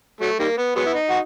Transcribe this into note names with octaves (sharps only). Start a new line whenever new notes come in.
F#3 A3
D#3 G3 A#3
B3
F#3 G#3 B3
E4
D#4
F#4